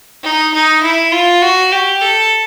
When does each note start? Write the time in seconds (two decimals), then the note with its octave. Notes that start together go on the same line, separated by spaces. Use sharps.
0.23 D#4
0.53 D#4
0.83 E4
1.12 F4
1.42 F#4
1.72 G4
2.01 A4